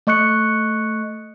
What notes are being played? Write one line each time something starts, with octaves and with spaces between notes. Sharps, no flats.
A3 D#5 C#6 F#6 C#7